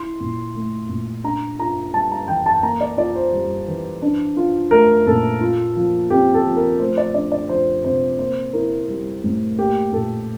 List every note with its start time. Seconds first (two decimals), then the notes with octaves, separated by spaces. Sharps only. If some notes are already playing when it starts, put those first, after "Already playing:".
Already playing: E4 C6
0.20 A#2
0.55 A3
0.89 A#2
1.24 D4 A#5
1.59 F4 A#5
1.93 G3 A5
2.11 A#5
2.28 E3 G5
2.46 A5
2.63 A#3 A#5
2.80 D5
2.97 F4 D5
3.16 C5
3.33 G3
3.68 E3
4.02 D4
4.37 F4
4.71 A3 A#4
5.07 A#2 A4
5.41 F4
5.76 F3
6.10 C4 G4
6.34 A4
6.46 F3
6.56 A#4
6.80 A3 C5
6.97 D5
7.14 D4 D5
7.32 D5
7.49 F3 C5
7.84 C3 C5
8.19 A#3 C5
8.53 E4 A#4
8.88 G3
9.24 A2
9.58 A#3 G4
9.92 A#2 A4